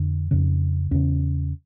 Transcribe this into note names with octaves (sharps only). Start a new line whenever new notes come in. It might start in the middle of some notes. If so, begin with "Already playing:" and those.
Already playing: F2 D3
F2 C#3
E2 C#3 C#4